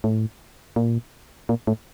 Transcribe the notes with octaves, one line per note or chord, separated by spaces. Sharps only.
A2
A#2
A#2
A2